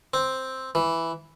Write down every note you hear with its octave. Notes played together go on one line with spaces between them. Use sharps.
C4
E3